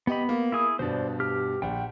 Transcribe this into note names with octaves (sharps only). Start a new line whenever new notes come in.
B3 G4 D#5 B5
A#3
E4 G#4 D#6
G2 B2 C5 D5
G4 F6
A#1 F#5 G5